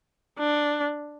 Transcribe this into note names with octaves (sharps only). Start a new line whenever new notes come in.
D4